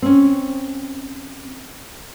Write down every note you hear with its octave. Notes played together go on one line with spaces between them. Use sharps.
C4 C#4